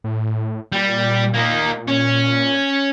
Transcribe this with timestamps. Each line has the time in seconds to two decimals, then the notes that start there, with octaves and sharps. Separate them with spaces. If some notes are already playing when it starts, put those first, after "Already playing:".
0.04 A2
0.72 A#2 G3
1.34 A#3 D#4
1.88 C#4